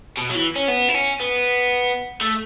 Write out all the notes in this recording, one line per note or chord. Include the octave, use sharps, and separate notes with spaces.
B2
F#3
E3
C#4
B3
E4
C#4
B3
A3